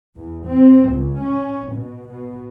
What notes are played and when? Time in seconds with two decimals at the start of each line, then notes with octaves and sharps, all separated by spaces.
0.16 E2
0.47 C4
0.92 C#2
1.21 C#4
1.73 B2
2.09 B2